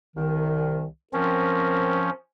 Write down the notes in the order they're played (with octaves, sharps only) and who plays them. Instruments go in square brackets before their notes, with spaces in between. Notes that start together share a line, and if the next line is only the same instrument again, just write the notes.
[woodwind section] C2 D#3
[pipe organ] F3 C#4 [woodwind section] C4 A#4